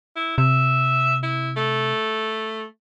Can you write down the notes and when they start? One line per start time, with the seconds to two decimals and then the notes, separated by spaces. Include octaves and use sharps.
0.16 E4
0.38 C3 E5
1.23 E4
1.56 A3